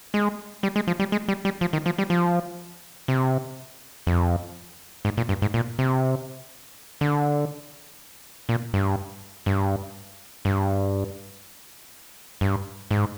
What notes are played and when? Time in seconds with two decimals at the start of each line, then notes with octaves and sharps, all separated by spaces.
0.14 G#3
0.63 G3
0.76 G#3
0.88 F3
1.00 G3
1.12 G#3
1.28 G3
1.45 G3
1.61 F3
1.73 D#3
1.86 F3
1.98 G3
2.10 F3
3.08 C3
4.07 F2
5.05 G#2
5.17 A#2
5.29 G2
5.42 G#2
5.54 A#2
5.79 C3
7.01 D3
8.49 A#2
8.74 G2
9.46 G2
10.45 G2
12.41 G2
12.91 G#2